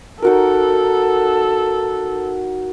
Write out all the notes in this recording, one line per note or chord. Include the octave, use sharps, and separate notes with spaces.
D#4 F#4 A4 A#4